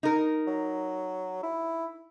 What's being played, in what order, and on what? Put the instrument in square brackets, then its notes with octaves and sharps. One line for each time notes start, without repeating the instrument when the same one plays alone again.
[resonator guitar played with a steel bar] D#4 A#4
[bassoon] F#3
E4